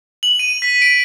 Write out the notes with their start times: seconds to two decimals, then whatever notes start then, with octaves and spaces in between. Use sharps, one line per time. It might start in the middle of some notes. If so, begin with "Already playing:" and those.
0.23 F#7
0.39 D#7
0.62 B6
0.82 D7